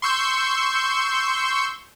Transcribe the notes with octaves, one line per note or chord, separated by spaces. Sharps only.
C6 C#6 E6 G6